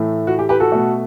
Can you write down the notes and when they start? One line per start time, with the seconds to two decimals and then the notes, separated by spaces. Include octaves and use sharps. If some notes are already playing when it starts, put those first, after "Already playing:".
Already playing: A2 E3 A3
0.27 F#4
0.39 G4
0.49 G4 B4
0.60 F#4 A4
0.72 B2 A3